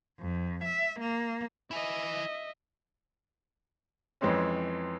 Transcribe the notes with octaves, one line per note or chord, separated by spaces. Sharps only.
F2
E5
A#3
E4 D#5 E5 G#5
F2 E3 G#3 C4 C#4